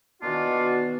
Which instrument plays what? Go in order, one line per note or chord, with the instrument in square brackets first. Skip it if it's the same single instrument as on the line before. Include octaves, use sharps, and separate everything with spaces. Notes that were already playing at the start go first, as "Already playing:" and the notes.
[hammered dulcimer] B2 D#3 E3 [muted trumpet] D4 [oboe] F4 [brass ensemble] F#4